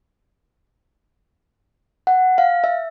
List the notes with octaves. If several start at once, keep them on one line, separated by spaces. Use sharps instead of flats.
F#5
F5
E5